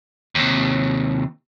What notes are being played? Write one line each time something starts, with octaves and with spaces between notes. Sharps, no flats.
D#2 C3